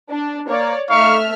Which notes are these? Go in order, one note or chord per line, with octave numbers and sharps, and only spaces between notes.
D4
A#3 C#5 D5
A3 D#4 E5 F5 C#6 F6